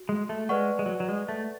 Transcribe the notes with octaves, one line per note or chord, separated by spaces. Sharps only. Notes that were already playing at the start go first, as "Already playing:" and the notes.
Already playing: F#4
G#3
A3
G#3 B4 D5 F#5 C#6
G#3
F#3
F#3
G#3
A3